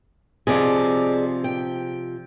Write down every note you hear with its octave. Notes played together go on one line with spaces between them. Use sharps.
C3 F3 G#4 D5 D#5
G5